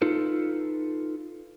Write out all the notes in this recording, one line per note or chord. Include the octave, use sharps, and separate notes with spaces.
D#4 F4 A4 B4